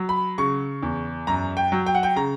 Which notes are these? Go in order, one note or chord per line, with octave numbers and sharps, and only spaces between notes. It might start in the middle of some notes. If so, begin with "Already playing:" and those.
Already playing: F#3
B5
C#3 C#6
E2
F#2 A#5
G5
F#3
G5
F#5
G5
C#3 A#5